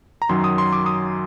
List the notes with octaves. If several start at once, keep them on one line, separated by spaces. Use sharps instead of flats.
A#5
F#2 D#3 F#3 C6
D#6
C6
D6
D#6